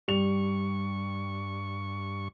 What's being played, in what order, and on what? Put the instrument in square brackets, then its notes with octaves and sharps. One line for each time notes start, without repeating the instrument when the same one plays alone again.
[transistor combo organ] G2 C#6 [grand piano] G3 F7